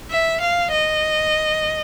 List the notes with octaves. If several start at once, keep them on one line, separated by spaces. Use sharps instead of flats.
E5
F5
D#5